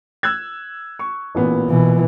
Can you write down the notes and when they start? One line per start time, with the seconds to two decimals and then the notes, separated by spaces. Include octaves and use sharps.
0.23 E6 F#6 G#6
0.99 C#6
1.35 A1 A#2 B3
1.70 B2 E3